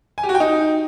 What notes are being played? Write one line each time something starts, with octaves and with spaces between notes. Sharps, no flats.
G#5
G4
F#4
G5
D#4